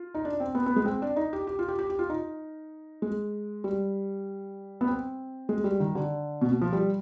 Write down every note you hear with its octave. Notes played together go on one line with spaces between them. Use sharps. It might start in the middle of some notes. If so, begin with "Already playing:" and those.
Already playing: F4
D#4
D4
C4
B3
B3
G#3
C4
D4
D#4
G4
G4
F4
G4
G4
G4
F4
D#4
G#3
G3
B3
C4
G#3
G3
D#3
D3
B2
B2
F3
G3